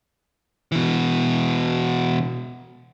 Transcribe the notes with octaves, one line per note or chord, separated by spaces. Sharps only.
B2 E3